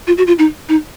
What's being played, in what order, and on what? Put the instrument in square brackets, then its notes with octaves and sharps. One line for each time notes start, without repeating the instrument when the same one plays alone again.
[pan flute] F4
F#4
F4
D#4
D#4